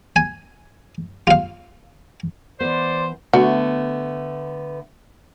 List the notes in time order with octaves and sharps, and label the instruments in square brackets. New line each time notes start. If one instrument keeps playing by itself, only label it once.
[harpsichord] G#5
F4 F5
[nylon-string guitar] E3 B3 [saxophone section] C5 [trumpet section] D5 C6
[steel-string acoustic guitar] D3 A3 B3 [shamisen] F#4